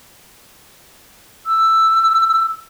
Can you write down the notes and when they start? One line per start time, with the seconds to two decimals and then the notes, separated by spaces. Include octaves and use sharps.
1.46 E6